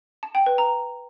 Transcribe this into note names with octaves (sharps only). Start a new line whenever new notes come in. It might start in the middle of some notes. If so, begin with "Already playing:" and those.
A5
G5
B4
A#5